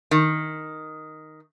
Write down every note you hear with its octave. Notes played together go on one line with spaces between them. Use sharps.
D#3